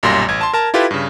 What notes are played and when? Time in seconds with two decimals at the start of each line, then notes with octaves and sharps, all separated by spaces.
0.03 B1 F#2 A#2 G3 C6 A#6
0.28 A1 G#6
0.41 A5 C6
0.54 A#4 A5
0.74 E4 F4 G4 A4 B4
0.91 G2 C#3